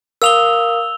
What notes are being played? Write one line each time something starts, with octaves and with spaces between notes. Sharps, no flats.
A#4 F5 D#6 E6 F7 G7